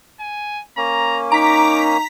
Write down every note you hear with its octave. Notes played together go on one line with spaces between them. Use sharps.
G#5
A#3 C#4 A#5
D#4 A#5 D6 B6